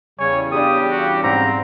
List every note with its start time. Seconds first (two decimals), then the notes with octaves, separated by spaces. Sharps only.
0.20 E2 C#3 G3 C#5 G#5
0.52 D4 G4 G#4 D#6
0.90 F#4
1.23 G#2 C4 D5 A#5